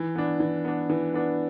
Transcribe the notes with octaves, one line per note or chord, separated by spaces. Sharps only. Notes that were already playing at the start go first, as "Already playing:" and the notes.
Already playing: E3
B3 D4
E3
B3 D4
E3
B3 D4